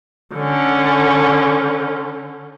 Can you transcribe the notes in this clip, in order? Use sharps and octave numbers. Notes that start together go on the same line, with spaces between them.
D3 C#4